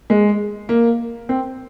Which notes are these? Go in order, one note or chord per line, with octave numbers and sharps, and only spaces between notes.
G#3
A#3
C4